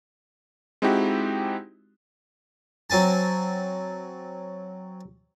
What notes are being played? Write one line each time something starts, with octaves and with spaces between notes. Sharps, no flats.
G#3 C4 D#4 E4 F#4 G4
F#3 C4 G#5 A5